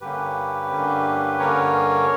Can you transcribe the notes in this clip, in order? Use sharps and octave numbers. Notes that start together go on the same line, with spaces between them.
G2 D3 A#3 C#4 G4 B4
G2 D3 A#3 C#4
G2 D3 A#3 C#4 A#4 C#5